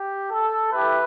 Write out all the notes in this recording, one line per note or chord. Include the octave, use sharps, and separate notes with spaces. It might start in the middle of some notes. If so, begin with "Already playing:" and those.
Already playing: G4
A4
A3 E4 G4 B4